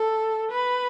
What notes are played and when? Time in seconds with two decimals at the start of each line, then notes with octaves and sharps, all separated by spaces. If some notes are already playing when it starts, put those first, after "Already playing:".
Already playing: A4
0.51 B4